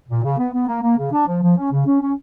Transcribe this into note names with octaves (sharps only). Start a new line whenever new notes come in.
A#2
C#3
B3
B3
A#3
A#3
C#3
D4
F3
F3
C#4
C#3
C#4
C#4